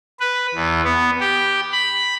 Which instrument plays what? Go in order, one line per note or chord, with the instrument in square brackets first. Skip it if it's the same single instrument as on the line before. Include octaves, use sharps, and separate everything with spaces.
[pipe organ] B4
E2
B3
G4
B5